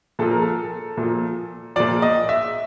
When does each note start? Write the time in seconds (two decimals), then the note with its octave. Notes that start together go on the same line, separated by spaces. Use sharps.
0.19 A#2 F3 A4
0.31 A#4
0.42 A4
0.97 A#2
1.03 F3
1.76 A#2 F3 D5
2.02 D#5
2.29 E5